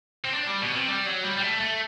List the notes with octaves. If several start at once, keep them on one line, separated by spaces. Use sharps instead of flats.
C4
D4
G3
B2
C3
G3
F#3
G3
G3
A3
A3